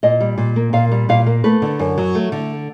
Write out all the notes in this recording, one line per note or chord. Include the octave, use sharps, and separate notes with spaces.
A#2 D#5
G3
A#2
A#3
A#2 F5
G3
A#2 F5
A#3
A3 B4
D3
F#2
F#3
A3
D3